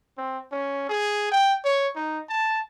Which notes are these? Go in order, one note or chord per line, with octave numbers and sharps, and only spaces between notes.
C4
C#4
G#4
G5
C#5
D#4
A5